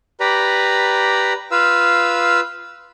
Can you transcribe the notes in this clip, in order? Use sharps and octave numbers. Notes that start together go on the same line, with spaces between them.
G4 B4 D5 A#5 B5
F4 B4 F5 E6